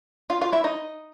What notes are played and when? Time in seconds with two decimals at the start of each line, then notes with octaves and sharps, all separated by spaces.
0.30 F4 F5
0.41 F4 F5
0.52 E4 E5
0.64 D#4 D#5